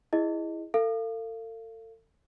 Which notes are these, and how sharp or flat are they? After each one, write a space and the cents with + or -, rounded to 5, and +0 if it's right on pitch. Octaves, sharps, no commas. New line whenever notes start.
E4 +0 G#4 -10 D#5 +0
A4 +40 F5 -25